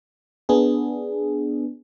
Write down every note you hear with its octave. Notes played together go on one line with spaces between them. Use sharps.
B3 D4 G#4